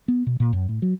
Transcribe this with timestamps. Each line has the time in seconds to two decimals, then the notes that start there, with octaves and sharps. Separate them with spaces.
0.08 B3
0.27 B2
0.40 A#2
0.53 F#2
0.69 A2
0.82 F#3